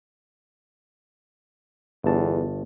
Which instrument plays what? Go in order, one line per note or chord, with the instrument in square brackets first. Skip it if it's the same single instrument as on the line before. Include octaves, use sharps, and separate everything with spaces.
[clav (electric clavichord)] G1 A5 [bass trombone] E2